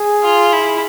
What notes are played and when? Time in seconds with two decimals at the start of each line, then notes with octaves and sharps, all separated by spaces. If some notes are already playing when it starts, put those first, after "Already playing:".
Already playing: G#4
0.23 F4
0.53 E4